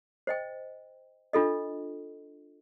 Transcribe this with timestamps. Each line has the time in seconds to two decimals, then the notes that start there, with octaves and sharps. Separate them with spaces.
0.27 C5 D#5 G5
1.33 D4 F4 A4 D#5